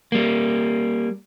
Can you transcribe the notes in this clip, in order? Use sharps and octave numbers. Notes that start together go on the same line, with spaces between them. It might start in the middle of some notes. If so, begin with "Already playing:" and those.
G3 A#3